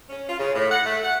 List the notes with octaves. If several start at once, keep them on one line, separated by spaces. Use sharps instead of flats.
C#4
F4
C#3
A2
F#5
A3
F#5